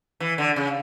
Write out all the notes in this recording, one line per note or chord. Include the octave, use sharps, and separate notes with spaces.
E3
D3
C#3